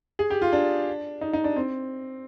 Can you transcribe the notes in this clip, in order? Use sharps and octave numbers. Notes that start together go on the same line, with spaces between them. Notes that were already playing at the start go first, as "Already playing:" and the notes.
G#4
G4
F4
D4
D#4
D#4
D4
C4